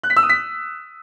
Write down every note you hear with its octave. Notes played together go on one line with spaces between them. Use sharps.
F#6
B6
E6
D#6
B6